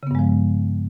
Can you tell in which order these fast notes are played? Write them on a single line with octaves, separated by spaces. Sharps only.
C#3 B3 G2 G#3 F3